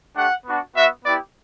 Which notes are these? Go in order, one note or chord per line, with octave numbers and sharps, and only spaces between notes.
A3 D4 G4 F#5
B3 D4 F#4
B3 F#4 E5
B3 E4 G4 D5